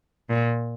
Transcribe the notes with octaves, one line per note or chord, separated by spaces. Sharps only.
A#2